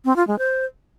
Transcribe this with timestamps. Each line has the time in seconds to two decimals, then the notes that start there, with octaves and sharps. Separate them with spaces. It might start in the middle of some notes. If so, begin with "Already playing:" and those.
0.05 C4
0.16 F4
0.27 G#3
0.39 C5